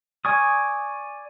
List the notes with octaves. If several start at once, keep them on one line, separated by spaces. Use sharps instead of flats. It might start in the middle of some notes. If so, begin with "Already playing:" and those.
D5 G#5 C#6 D#6